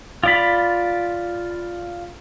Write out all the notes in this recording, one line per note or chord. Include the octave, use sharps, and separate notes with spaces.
F4 D5 B5